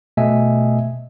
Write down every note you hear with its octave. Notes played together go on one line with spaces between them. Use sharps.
B2 A3 D#5 E5 G#5